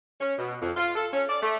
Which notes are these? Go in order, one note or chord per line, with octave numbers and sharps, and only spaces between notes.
C#4
B2
F2
F4
A4
C#4
D5
A3